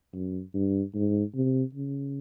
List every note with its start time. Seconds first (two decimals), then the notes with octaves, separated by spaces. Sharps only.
0.13 F#2
0.54 G2
0.94 G#2
1.35 C3
1.74 C#3